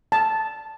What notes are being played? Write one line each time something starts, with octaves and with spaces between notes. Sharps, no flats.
A5